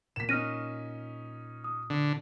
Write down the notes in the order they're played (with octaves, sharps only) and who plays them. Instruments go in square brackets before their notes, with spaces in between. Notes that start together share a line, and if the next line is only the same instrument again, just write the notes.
[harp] A#2 A#3 [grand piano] B6 E7
[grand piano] C#4 D#4 [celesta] F6 A#6 D#7 [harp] F#6 C#7
[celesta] D#6
[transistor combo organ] D3